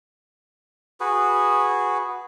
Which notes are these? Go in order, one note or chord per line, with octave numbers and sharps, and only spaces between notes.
F#4 G#4 B4